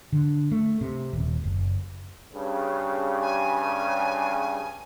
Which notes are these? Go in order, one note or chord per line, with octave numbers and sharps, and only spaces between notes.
D3
A3
C3
D#1
F#1
G2 C#3
G#5